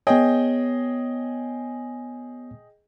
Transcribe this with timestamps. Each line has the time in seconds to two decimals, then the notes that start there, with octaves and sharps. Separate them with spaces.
0.07 B3 G#4 C#5 D#5 G5